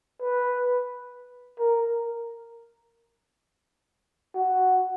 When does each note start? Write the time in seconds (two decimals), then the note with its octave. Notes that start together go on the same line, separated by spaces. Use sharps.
0.22 B4
1.59 A#4
4.35 F#4